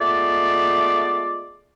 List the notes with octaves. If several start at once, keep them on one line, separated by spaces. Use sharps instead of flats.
G#3 A3 B3 F4 D5